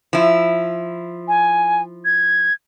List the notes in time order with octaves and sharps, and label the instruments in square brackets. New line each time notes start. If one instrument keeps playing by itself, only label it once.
[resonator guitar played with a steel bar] F3 E4
[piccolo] G#5
G#6